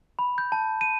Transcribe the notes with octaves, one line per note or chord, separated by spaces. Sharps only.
B5
G6
A5
D#7